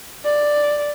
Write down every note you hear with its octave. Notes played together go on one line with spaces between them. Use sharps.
D5